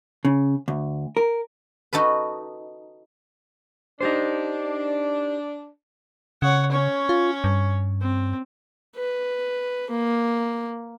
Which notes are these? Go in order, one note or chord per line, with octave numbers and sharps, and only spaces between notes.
C#3
D2
A#4
D#4 F#4 A4 B4
D4 D#4 G4 C5
C#3 C#5 F#5
C#4 C#5
F4
G2
C4
B4
A#3